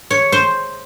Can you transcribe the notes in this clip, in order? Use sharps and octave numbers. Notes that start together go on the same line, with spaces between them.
C#5
C5